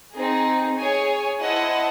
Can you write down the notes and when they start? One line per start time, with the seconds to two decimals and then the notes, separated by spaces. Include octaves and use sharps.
0.14 C4 D#4 G#4
0.76 G#4 C#5 G#5
1.39 E4 C5 D#5 F#5 A5